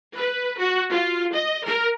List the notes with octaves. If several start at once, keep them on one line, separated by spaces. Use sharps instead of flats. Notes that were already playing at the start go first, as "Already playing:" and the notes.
B4
F#4
F4
D#5
A#4